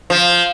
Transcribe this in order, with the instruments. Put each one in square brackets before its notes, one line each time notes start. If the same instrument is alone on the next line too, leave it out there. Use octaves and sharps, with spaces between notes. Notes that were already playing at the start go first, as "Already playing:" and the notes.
[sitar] F3